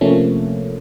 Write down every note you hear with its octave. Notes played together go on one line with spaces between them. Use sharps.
C3 F3 A3 A#3 C#4